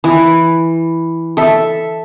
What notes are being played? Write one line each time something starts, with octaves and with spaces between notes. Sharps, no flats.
E3
A4 E5